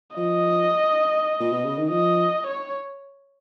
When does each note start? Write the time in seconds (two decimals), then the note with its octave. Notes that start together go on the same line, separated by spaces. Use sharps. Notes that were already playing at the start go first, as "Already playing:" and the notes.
0.17 F3 D#5
1.40 A#2
1.53 B2
1.65 C#3
1.78 D#3
1.90 F3 D#5
2.47 C#5